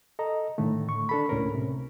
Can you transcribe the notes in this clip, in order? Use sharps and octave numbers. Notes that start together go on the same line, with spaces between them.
A4 D#5 A#5
A2 D3 D#3 A3
C#6
D4 A4 B5
C#2 A2 C#4 A#4
C3